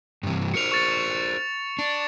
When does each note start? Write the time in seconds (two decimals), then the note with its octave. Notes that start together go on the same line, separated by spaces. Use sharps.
0.23 G2 C3 E3
0.54 F#4 A#4 C5 C#7 F7
0.72 C#6 A6 C#7
1.79 D4